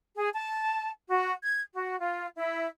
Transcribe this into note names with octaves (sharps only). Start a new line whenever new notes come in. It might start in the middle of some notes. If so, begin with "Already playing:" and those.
G#4
A5
F#4
G#6
F#4
F4
E4